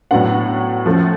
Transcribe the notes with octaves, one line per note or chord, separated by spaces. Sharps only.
A2 F#3 B3 D4 F#5
F3 A3 C#4